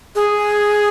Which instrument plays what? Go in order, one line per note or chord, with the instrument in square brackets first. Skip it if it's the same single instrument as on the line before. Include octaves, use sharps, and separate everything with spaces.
[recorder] G#4